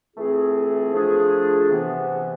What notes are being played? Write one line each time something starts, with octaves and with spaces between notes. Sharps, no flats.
E3 A3 C4 F4 G#4
F3 A3 D4 F4 G#4
C3 E3 B3